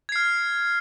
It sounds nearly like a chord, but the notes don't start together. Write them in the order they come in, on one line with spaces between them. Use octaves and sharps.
G#6 C7 F6